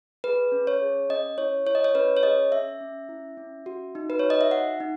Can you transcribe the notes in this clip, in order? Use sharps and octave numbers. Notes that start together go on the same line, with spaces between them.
G#4 B4
C#4
C#5
G#4
C#4 D#5
E4 C#5
E4 C#5
D#5
C#5
C#4 B4
C#5
G#4 D#5
C#4 E5
C#4
E4
C#4
F#4
D#4
B4
F#4 C#5
D#5
E5
D#4 F#5
D#4